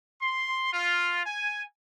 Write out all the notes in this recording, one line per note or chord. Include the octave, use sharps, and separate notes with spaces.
C6
F4
G#5